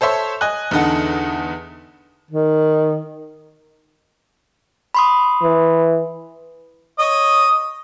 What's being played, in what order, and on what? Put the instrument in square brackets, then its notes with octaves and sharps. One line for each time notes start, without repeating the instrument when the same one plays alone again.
[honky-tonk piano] A4 C5 C#5 E5 C6
D#5 G#5 F#6
E2 D3 D#4 A4 F#5
[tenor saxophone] D#3
[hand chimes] B5 C6 D#6
[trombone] E3
[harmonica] C#5 D#5 D#6